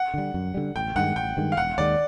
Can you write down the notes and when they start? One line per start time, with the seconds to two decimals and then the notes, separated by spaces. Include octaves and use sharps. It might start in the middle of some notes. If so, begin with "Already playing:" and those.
Already playing: F#5
0.14 D3 G3
0.34 F#2
0.54 D3 G3
0.76 A1 G5
0.96 G2 D#3 G#3 F#5
1.16 A1 G5
1.37 G2 D#3 G#3
1.52 F5
1.57 E1 F#5
1.78 D#2 D#3 G#3 D5